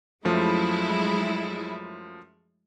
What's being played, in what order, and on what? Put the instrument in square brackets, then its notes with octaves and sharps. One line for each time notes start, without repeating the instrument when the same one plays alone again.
[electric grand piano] F#2 F3 A3 [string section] F#3 G#3 E4